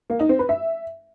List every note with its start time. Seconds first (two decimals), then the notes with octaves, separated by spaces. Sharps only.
0.10 A#3
0.19 D#4
0.29 C4
0.39 B4
0.49 E5